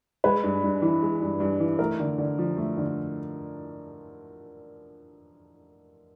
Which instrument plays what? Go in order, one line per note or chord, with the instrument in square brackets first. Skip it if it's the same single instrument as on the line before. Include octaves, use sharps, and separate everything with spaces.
[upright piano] G#3 [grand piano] B4
[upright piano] G2
G2
E3
G#3
G2
G2
E3
[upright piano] A3 [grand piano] A#4
[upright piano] D3
D3
F3
A3
D3